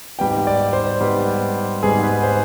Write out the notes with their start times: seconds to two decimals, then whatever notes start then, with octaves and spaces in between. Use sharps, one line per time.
0.19 G#2 G3 B3 G5
0.47 D5
0.73 C5
1.01 G#2 G3 B3
1.82 G#2 G3 B3 G#4
2.03 B4
2.23 C5